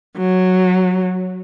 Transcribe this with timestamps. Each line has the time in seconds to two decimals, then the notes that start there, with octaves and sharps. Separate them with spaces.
0.17 F#3